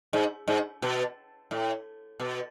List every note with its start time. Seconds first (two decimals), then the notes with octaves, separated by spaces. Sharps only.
0.13 G#2
0.48 G#2
0.82 B2
1.51 A2
2.20 B2